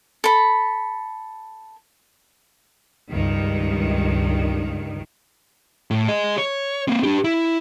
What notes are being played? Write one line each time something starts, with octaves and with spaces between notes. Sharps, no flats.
A4 B5
C#2 G2 D#3
A2
G#4 D#5
C#5
A#3 C4
D4 G4
E4